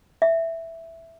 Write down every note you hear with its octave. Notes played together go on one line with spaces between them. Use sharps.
E5